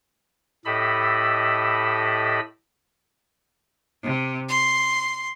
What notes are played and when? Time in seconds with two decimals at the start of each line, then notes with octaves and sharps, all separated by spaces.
0.65 A2 G4 A4 D#5 B5 E6
4.02 C3
4.48 C6